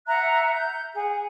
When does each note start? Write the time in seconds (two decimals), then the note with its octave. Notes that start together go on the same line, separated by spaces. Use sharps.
0.06 E5 F#5 A#5 F#6
0.50 G6
0.93 G#4 F#5